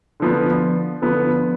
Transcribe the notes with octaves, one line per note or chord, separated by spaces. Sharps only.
D3 F3 B3
D3 F3 B3